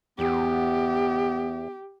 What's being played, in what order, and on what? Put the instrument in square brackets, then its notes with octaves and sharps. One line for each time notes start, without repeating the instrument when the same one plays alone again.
[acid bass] E2 [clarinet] B3 [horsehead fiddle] G4